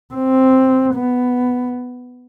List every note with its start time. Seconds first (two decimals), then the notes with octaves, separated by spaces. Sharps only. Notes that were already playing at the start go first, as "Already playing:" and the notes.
0.14 C4
0.95 B3